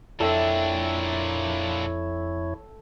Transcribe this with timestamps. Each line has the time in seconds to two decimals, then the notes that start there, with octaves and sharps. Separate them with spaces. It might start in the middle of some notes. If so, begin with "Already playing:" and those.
0.20 F2 A#2 D4 E4 A4 C#5 E5 G5